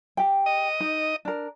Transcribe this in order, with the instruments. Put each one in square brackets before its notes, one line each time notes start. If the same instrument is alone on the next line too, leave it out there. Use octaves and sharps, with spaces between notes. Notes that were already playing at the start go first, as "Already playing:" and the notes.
[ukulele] G4 G5
[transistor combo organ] D#5
[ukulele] D#4
D4 A#4